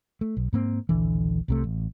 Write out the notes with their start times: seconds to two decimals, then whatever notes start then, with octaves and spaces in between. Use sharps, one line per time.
0.21 A3
0.37 B1
0.53 G#2 A#3 C4
0.89 D#1 A#1 D3 E3
1.48 C2 C3 A3
1.64 A1